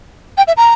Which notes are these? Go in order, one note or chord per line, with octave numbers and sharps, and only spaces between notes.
G5
E5
A#5